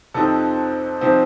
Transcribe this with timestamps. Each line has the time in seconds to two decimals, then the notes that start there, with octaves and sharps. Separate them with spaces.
0.14 F2 C3 F3 C4 D#4 A4
1.01 C3 F3 C4 D#4